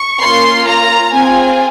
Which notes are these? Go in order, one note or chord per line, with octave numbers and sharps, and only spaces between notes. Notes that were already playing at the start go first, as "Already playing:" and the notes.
Already playing: C#6
A#3 C#4 F4 C6
A#5
C4 F4 G#4 G#5